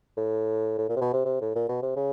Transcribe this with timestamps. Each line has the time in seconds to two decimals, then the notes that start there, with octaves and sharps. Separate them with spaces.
0.17 A2
0.78 A2
0.89 A#2
0.96 C3
1.01 B2
1.13 C3
1.25 C3
1.41 A2
1.56 A#2
1.69 B2
1.82 C3
1.96 C#3